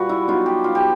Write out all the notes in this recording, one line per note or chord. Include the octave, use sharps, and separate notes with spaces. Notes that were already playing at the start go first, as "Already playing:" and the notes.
Already playing: A#2 G3 A#3 F#4 B4
E4
F#3 B3 D#4 F4
G4
F4
G4